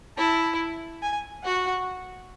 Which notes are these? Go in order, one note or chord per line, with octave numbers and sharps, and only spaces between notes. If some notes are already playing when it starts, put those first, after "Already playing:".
E4 A5
G#5
F#4 F#5